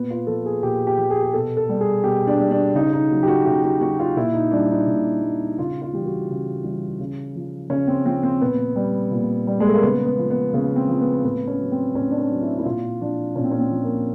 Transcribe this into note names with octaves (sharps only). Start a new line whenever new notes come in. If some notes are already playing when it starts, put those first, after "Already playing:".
Already playing: A#2 B3
F4
F3 A4
G#4
A#2 G4
G4
F3
G#4
G#4
B2 A4
A4
G3
G#4
B2 G4
D4
G3
D4
C#3 D#4
D#4
F#3
G4
F#4
C#3 G4
F#4
F#3 F#4
F4
A#2 E4
D#4
G3 D4
D#4
A#2
G3
C#3 F4
F4
E3 G3 G4
F#4
C#3
E3 G3
C#3
F3
C#3 C#4
C4
F3 C4
C4
A#2 B3
G3
A#2
G3
G#3
A3
A#3
C#3 B3
B3
F3
B3
C#3 B3
C4
F3
B3
A2 B3
C#4
F#3
C4
A2 C#4
D4
C#4
F#3
E4
E4
A#2 F4
F3 D4
A#2 C#4
C4
C#4
C4
F3
A#3